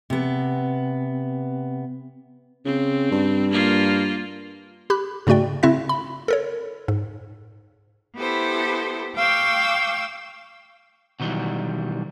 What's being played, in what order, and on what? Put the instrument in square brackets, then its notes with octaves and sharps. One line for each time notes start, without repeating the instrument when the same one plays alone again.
[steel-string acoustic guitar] C3 B3
[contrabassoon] C#3 [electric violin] C4
[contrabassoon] G2
[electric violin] A#3 F4
[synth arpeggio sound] G4 B5 F#6
G#2 C#3 A3 F#4 D5 G5
C#3 C4 E4 E5 F#6 A#6
B5
A4 A#4 C#5
G#2
[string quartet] B3 E4 G4 A4 C5
F5 G5 C#6 D6 E6 G6
[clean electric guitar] B2 D#3 E3 F#3 G3